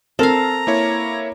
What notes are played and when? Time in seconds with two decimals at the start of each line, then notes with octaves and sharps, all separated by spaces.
0.19 C4 A4 A#4 F5 A#5
0.67 A#3 E4 C#5